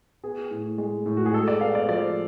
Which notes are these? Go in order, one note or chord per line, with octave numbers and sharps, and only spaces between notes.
B3 G#4
A2
G#3
A2
F#4
G#4
G#3 A4
D5
B3 F5
D5
F3 D5